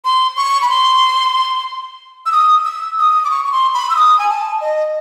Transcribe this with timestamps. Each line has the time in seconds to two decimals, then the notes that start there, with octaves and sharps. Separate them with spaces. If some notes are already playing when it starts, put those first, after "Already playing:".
0.05 C6
0.37 C#6
0.62 B5
0.69 C6
2.26 E6
2.32 D#6
2.65 E6
2.99 D#6
3.24 D6
3.31 C#6
3.45 C#6
3.52 C6
3.74 B5
3.90 E6
3.96 D#6
4.19 G#5
4.29 A5
4.61 D#5